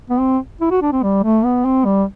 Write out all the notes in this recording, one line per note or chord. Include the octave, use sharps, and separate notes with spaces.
B3
C4
E4
F#4
D4
C4
G3
A3
B3
C4
G3